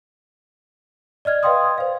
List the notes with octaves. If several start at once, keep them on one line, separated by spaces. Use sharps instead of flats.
D5 D#5 F6 G#6
B4 D#5 F5 G5 C6 D#6
C5 F5